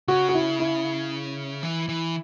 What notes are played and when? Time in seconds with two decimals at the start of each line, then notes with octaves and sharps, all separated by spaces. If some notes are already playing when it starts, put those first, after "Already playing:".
0.08 C#3 F#4
0.29 F#4
0.34 E4
0.60 E4
1.63 E3
1.89 E3